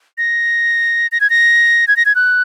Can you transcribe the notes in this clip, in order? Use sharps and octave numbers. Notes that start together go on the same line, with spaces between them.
A#6
A#6
G#6
A#6
G#6
A#6
G#6
F#6